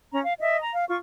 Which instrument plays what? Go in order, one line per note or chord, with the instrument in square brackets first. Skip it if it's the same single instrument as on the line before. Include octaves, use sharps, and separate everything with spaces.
[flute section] C#4 A#5
F5
D#5 E5
A#5
F5
F4 C#6